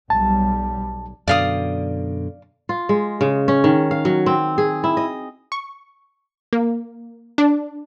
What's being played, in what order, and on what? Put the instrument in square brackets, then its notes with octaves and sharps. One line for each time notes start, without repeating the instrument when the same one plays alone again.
[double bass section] B1 G3 [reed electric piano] A5
[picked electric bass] F#2 B2 D3 [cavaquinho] D5 F5 D#6
[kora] F4
G#3
C#3
C#4
D#3
F5
F#3
C4
G#4
E4
D#5
[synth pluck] C#6
A#3
D4